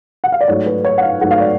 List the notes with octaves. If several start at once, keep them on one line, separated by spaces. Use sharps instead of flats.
F#5
F5
D5
G#2 F#3 A3 C#5
B4
C#5
F#5
F5
G#2 F#3 A3 F#5
F5
D5